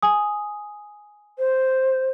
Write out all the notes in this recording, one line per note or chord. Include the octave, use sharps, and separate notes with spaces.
G#5 D#6
C5